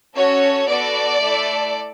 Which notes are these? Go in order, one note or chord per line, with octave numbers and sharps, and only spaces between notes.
C#4 F#4 A4 C#5
B3 F#4 A4 D5
A3 E4 A4